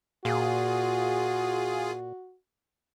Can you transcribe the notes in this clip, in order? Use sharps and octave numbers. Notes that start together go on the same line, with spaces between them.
A#2 F4 F#4 G#4